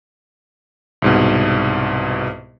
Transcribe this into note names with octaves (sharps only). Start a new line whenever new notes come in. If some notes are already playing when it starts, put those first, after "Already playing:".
C2 G#2 B2